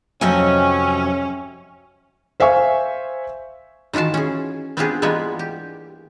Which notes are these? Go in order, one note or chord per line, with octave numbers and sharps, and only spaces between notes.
F2 C3 F#3 C#4 D#5 E5 G5 G#5
C5 E5 F5 G#5 C#6
D#3 E3 F4 F#4 A5
C#4 G#4
B3 C4 D4 F4 G4 G#4
E3 G3 G#3 A#3 B3 F4
G4